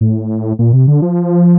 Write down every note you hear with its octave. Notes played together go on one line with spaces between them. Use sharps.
A2
A#2
C3
D3
F3